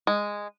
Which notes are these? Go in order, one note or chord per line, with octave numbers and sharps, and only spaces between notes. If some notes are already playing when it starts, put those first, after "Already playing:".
G#3